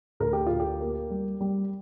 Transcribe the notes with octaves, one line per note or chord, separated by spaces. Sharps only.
D2 A#4
G4
D2 F4
G4
A#3
G3
G3